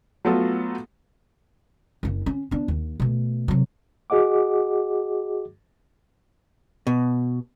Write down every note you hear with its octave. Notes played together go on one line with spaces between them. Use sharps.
F#3 A3 B3 F4 F#4 A4
F#1 C#3
C#4
B3 D4
D#2
B2 A3
C3 F#3
F#4 G#4 D#5 F#5 D6
B2